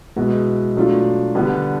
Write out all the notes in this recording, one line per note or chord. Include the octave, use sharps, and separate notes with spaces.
B2 G#3 B3 E4
B2 F#3 A3 D4 F4
D3 G3 B3 D4